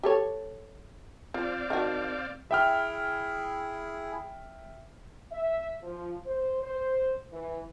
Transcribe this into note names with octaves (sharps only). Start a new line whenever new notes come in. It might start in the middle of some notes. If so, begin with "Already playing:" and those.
G4 A4 C#5
F3 C4 D5 F5
D#3 D4 F#4
E4 G#4 E5 G5 F6
E5
F3
C5
C5
E3